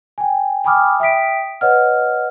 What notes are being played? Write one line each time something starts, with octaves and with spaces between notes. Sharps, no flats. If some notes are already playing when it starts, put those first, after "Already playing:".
G5 G#5
G5 G#5 B5 D6 D#6 F6
E5 G5 D#6 B6 D7
B4 C#5 D#5 F#5 F6